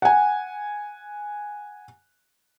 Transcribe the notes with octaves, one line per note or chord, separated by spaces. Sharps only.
F#5 G#5